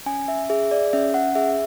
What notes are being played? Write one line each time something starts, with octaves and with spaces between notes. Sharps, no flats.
C#4 G#5
E5
G#4 E5
D5
C#4 E5
F#5
G#4 E5